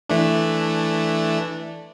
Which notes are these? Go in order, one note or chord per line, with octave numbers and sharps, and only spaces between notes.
E3 A3 D4